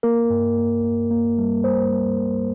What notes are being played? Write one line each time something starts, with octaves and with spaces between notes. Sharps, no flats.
A#3 A#4
G2
A#3
A#3
A#3
G3
G3 C5
G3
G3